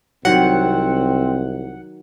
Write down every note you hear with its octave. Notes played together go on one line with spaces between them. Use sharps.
C2 D#3 F#3 C4 F#5